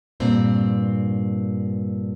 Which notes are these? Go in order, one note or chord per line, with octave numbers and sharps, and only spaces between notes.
G2 A#2 C4